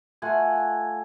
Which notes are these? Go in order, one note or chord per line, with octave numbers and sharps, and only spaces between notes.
A3 F4 F#5 G#5